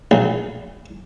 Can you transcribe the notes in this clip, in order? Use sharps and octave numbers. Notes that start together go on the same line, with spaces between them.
A#1